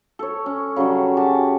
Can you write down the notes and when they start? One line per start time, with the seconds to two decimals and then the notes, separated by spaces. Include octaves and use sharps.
0.19 A4 C#5
0.46 C#4
0.76 C#3 F#3 G3 C#4
1.17 F#4 G4 G#5 A5